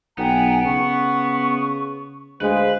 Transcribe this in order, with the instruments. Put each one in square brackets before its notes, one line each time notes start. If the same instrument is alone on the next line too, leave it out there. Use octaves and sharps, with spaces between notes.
[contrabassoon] B1 [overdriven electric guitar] B3 [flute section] G5 G#5 A#5
[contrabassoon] C#3 [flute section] C#6
[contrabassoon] D2 [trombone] G#3 [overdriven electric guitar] B4 [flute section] C5 F5